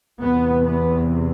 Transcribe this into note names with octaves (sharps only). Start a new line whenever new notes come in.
E2 C3 B3
B3